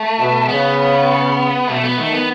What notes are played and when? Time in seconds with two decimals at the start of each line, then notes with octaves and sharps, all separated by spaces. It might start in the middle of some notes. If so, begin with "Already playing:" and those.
Already playing: A3
0.18 B2
0.49 C#3 B3
1.68 B2 A3
1.83 B3
1.98 D#3 A3
2.13 B3